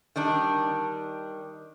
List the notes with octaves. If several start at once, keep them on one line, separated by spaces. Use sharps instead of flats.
D#3 G3 D4